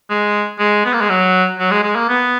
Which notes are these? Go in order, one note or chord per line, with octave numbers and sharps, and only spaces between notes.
G#3
G#3
B3
A#3
G#3
F#3
F#3
G#3
G#3
A#3
B3